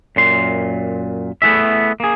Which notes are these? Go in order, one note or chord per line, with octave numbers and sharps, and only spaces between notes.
F#2 A#2 C6
A3 B3 E4 G#4 E5
A#3 G#4